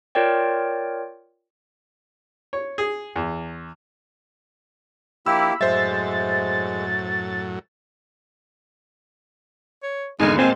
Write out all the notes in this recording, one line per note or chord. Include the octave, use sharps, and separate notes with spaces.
F4 A#4 C#5 D5 G5
C#5
G#4
E2
F3 A#3 D4 E4 G4 B5 E6
F#2 A2 F#3 G#3 C5 E5 A6
C#5
G#1 E2 D3 G#3 D#4 G#5 F6
A#2 G#3 C4 F5 G#5 A5